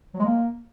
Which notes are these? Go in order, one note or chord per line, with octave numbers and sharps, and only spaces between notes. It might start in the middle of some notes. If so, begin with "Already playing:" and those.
F#3
G#3
A#3